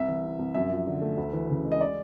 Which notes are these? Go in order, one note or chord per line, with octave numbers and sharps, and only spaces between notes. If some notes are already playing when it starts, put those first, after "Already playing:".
Already playing: C2 E5
E3
C3
C2
F#2 E5
F3
D3
A3
D2
E3
C#3
G#3
D#5
D5